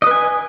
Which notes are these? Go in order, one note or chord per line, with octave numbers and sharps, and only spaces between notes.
B4 D#5 G#5